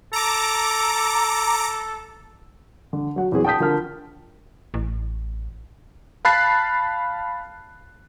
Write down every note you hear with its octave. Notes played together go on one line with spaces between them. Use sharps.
A4 A#5 D6
D3
F#3 F#5
E2 F#3 C4 G#4
G5 A5 D#6 G6 B6
D3 F3 A#4 A5 F6
A1
F5 A5 B5 F#6 A6 C7